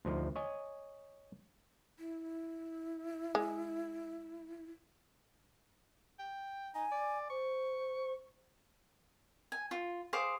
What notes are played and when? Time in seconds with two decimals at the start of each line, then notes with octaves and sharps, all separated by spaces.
0.05 D2 F3 D#4
0.36 C#5 D#5 G#5
1.99 E4
3.35 G#3
6.19 G5
6.75 D#4 G#5
6.92 D5
7.30 C5 C#6
9.52 G#5
9.71 F4
10.13 G#4 C5 F5 D6